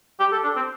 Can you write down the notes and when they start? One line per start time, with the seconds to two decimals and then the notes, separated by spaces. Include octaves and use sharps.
0.20 G4
0.32 A4
0.44 D4
0.56 C4